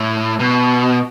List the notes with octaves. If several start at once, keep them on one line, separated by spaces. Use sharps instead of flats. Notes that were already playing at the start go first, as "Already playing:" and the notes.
Already playing: A2
B2